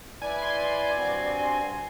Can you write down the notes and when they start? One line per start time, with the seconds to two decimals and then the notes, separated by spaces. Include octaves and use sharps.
0.22 E4 B4 D5 G#5
0.38 G#5 C6
0.94 G2 C4 F#4